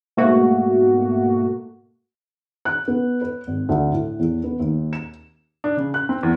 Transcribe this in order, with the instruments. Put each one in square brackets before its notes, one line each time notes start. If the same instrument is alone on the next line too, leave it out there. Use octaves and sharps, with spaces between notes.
[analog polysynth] G#2 B2 A3 A#3 F#4
[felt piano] F#6
B3
B4
G#1
D2
A2
E2
B3
D#2
E7
[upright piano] D4
C#3
F#6
C4
E2